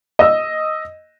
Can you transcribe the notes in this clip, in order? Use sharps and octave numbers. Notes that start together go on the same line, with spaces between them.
D#5 E6